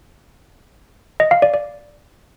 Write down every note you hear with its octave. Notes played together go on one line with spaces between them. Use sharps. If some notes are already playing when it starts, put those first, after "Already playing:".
D#5
F5
D5
D5